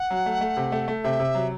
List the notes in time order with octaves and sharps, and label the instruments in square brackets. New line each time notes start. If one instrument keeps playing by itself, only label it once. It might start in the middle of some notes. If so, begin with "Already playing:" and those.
Already playing: [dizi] F#5
[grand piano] F#3
A3
A3
C3
A3
A3
[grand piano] C3 [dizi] E5
[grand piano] C3
F#3